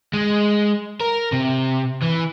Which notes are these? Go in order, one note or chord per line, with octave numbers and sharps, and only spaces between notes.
G#3
A#4
C3
E3